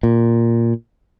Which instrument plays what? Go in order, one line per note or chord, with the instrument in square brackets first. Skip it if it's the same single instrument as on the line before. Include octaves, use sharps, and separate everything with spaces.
[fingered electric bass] A#2